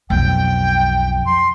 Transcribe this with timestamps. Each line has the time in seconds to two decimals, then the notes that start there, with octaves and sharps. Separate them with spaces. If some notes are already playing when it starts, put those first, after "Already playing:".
0.10 B1 F2 G5
1.26 C6